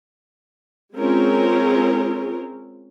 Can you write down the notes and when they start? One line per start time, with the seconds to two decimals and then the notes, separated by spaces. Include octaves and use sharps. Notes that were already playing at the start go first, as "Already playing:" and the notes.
0.96 G#3 C4 C#4 F4 G#4 A#4